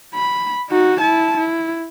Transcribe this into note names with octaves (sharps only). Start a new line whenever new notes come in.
B5
D#4 F#4
E4 A5
E4